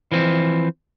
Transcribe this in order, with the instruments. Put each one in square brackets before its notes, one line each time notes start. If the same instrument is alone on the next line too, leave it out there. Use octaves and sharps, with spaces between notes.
[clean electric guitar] E3 F3 C4